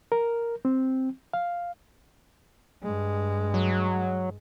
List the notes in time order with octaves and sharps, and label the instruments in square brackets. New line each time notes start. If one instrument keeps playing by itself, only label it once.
[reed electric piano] A#4
C4
F5
[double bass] G2 G#3
[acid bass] F#3